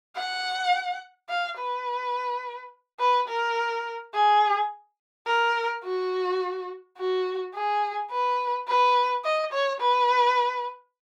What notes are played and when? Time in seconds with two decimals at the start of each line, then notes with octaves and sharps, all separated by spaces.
0.16 F#5
1.29 F5
1.58 B4
3.00 B4
3.28 A#4
4.14 G#4
5.27 A#4
5.84 F#4
6.98 F#4
7.54 G#4
8.11 B4
8.68 B4
9.24 D#5
9.53 C#5
9.81 B4